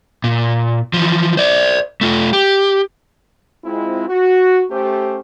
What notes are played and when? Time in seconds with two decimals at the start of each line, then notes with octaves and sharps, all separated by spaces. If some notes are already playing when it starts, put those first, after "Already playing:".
0.24 A#2
0.93 E3 F3
1.37 C5 D5
2.01 A3 F4
2.33 G4
3.65 G#3 C4 E4 F4
4.09 F#4
4.71 A3 C#4 G4 C5